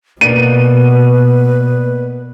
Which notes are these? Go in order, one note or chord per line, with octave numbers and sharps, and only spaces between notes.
B2 A#3 B4 D5 D#7